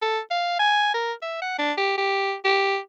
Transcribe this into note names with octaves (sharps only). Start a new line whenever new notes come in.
A4
F5
G#5
A#4
E5
F#5
D4
G4
G4
G4